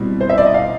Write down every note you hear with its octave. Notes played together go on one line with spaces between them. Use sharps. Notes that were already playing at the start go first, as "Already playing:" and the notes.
Already playing: B2 G3 C4 E4
C5
E5
D5
D#5
F5